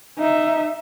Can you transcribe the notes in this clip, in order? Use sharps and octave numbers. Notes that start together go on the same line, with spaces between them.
D#4 E5